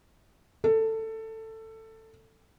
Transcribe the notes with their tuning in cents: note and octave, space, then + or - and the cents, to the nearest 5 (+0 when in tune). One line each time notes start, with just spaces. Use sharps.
A4 +15